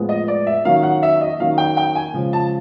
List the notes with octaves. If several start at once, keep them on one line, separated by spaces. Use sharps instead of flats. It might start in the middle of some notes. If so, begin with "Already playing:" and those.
Already playing: A2 F3 G#3 B3
D#5
D5
E5
D#3 F#3 A#3 C#4 F5
F#5
E5
D#5
D#3 F#3 A#3 C#4 F5
G5
G5
G#5
C#3 F3 G#3
A5